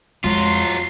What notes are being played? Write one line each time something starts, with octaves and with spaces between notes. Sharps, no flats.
F2 F#3 G#3 F4